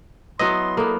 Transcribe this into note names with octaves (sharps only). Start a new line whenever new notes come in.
F#3 B3 E4 B4 D#5 C6
A#3 B3 A4